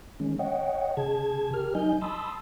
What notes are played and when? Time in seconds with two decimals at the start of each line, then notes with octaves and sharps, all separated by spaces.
0.20 D#3 G#3 C#4
0.39 C#5 D#5 F#5 G5
0.97 C#3 G#4 A5 G#6
1.54 G4 A#4 F6
1.75 F#3 D#4 D#5 G#5 G6
2.01 A5 B5 C6 D#6 E6 A6